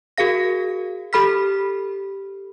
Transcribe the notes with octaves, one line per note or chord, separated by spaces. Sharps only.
F#4 G#4 A#4 F5 A#6
G4 A4 B5 F6 B6